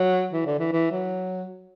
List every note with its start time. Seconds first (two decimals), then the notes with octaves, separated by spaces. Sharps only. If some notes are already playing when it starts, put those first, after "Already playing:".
Already playing: F#3
0.33 E3
0.46 D3
0.59 E3
0.72 E3
0.91 F#3